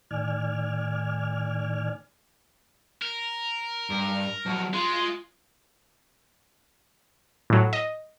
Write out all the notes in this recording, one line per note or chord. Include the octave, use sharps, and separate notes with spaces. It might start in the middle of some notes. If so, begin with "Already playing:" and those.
A2 D#3 D5 G#5 F6
A#4
G2
F3 F#3
G#3 F4 C6
A2 F#3
D#5